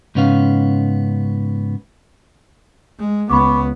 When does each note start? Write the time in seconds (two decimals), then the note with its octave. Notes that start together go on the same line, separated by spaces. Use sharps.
0.15 G#2 C#3 B3 C#4 F5
2.99 G#3
3.30 C#2 B3 B5 C#6 D6